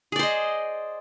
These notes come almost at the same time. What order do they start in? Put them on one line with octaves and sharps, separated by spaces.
G#4 D5 C5 D#5